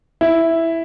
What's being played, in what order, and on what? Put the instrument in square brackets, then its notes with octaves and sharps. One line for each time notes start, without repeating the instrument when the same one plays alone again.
[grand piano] E4